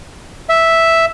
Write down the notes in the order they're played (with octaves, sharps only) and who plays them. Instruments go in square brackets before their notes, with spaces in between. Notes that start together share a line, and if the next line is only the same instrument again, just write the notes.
[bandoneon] E5